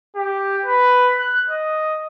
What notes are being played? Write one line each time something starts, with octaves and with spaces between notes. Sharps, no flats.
G4
B4
F#6
D#5